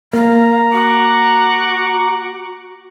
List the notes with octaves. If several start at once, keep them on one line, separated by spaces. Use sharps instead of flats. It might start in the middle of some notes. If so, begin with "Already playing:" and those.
A#3 F5 A#5
F#4 F#5 C#6 D6